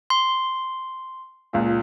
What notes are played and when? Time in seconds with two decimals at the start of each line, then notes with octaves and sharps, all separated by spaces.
0.10 C6
1.53 C#2 A#2